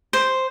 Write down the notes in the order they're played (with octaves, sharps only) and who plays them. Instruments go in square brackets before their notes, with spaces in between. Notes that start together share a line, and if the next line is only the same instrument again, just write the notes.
[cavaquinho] C5